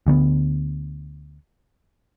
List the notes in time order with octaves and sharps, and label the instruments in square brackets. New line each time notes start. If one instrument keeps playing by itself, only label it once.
[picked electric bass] D2 D3 A3 B3